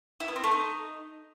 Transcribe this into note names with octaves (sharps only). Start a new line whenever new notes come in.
E4
B3
C4
A3
D#4